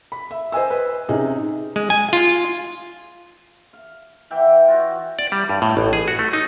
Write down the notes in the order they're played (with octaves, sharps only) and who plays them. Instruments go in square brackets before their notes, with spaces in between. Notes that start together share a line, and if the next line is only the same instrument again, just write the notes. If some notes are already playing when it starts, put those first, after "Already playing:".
[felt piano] B5
E5
C5 D#5 G#5 E6
B4
C3 C#4 D#4 G#4
[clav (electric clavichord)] G#3
G#5
F4
[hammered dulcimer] F5
E3 E5 F#5 G5
F4 F#4 C#5
[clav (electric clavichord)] D5
G3
G2
A2
A1
G#4
F#4
A3
D#4